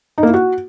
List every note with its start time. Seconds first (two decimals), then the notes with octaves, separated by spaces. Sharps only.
0.18 D#4
0.23 A#3
0.28 E4
0.34 F#4